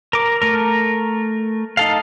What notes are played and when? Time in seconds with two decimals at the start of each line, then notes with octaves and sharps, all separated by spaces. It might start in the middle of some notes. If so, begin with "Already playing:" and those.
0.13 A#4 D6
0.42 A3 A#4
1.77 D#4 A4 F5